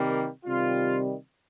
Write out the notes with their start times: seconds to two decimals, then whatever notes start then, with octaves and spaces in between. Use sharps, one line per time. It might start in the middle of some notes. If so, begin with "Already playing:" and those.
Already playing: C3 D#3 G3 A#3
0.45 C3 D#3 G3 F4